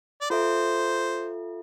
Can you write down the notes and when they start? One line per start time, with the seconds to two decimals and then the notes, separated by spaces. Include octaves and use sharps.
0.21 D5
0.30 F4 A4 C5 E5